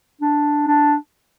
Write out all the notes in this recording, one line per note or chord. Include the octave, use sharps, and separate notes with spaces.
D4
D4